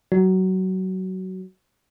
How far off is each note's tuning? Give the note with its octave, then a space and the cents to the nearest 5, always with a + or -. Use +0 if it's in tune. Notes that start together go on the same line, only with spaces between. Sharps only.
F#3 +20